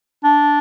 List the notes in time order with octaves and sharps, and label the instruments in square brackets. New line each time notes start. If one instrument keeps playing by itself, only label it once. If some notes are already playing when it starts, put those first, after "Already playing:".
[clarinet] D4